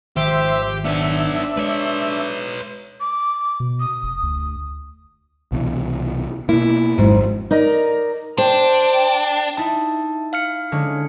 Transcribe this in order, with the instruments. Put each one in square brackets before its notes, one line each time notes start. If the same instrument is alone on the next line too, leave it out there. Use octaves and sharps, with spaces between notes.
[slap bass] G#1 D#3 F3 [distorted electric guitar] G4 [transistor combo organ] C5 E5
[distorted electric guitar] B3 C#5 [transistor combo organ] D4 E5
[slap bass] G#3 [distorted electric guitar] B4 C#5
[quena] D6
[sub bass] B2
[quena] D#6
[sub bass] F1
D2
[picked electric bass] C2 B2 E3
[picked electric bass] B2 A#3 [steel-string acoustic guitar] E4
[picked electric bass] G#1 F2 F#3 [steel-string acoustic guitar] G#2
[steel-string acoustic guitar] D#4 A#4 D5
[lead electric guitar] D4 [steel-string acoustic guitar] C5 [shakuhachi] G5
[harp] D#4 E4 [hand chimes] A5
[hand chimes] F5 F6 C#7
[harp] D3 G#3 C#4